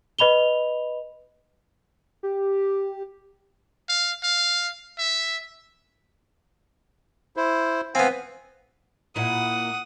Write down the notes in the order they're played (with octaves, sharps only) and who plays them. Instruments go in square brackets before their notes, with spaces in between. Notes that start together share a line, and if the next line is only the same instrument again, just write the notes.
[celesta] B4 D#5 B5 F7 G7
[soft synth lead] G4
[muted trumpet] F5
F5
E5
[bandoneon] E4 C5
[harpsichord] B3 C4 [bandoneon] F5 G#5
[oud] A#2 E4 [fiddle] F#5 D#6